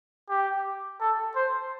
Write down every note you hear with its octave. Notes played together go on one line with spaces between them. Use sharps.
G4
A4
C5